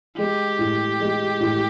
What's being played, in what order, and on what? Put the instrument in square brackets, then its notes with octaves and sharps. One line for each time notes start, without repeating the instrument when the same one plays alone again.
[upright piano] G#3 [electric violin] G4
[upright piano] A2
G#3
A2